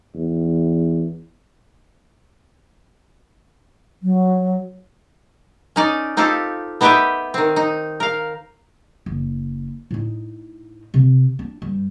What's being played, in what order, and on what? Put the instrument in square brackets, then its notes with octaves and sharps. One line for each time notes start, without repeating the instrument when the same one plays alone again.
[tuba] E2
[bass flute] F#3
[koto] C#4 D#4 D5
C4 D#4 F4 G4 A4
B3 D#4 G4 B4 E5 G5
D#3 C4
D#4
A#4 F5
[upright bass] F#1
A2 D#4
C3
D4
G2